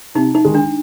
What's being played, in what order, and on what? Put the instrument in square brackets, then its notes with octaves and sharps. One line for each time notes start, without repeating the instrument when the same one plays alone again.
[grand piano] C3 [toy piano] D#4
[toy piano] D#4
[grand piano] D#3 G#3
[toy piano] D4